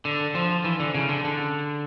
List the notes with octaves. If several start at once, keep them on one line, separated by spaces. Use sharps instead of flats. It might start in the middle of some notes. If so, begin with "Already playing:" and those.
D3
F3
E3
D3
C#3
D3
D3